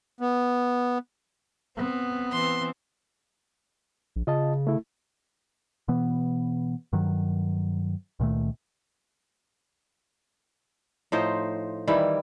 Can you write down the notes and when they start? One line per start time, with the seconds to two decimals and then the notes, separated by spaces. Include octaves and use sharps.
0.21 B3
1.77 B3 C4
2.31 E3 C4 C6
4.16 A#1
4.27 C#3 F4 D#5 A5
4.67 A3 E4
5.88 B2 E3 B3
6.93 G2 D#3 F#3
8.20 C#2 A#2 D#3 A3
11.12 A2 F3 D#4 C5
11.87 D#3 E3 G3 E4